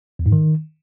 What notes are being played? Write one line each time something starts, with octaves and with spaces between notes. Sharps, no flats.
E2
G#2
D#3